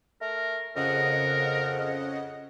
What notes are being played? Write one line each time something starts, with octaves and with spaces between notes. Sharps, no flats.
A3 A#4
F2 C#3 A#4 D#5 F#5